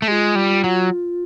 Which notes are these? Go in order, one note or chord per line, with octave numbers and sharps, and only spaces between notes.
A3
G#3 F4 G4
G3
F#3